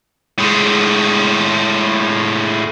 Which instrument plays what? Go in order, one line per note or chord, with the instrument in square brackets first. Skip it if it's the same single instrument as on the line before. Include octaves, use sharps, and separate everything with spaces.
[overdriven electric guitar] A2 G#3